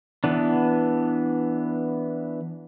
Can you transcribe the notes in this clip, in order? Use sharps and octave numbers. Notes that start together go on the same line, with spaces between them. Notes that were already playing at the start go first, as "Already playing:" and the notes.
E3 B3 D4